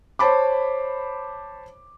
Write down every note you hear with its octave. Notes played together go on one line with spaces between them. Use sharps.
C5 C#5 A5 B5 D6